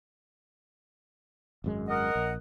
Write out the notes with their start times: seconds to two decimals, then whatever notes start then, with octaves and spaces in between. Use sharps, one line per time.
1.64 G#1 F#2 G#3
1.88 A#4 D#5 F#5
2.15 A#1